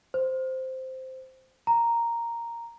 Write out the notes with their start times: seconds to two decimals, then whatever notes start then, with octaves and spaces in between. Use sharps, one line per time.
0.14 C5
1.67 A#5